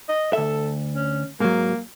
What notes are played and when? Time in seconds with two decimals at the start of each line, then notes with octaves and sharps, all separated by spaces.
0.09 D#5
0.33 D2 A4 E5
0.96 C#4
1.40 G#2 F#3 A#3